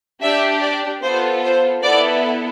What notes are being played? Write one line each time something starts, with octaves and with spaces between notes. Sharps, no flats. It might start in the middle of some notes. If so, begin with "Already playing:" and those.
D4 G4 E5
D5
B3 F4 A4 C5
C5
B3 E4 A4 D5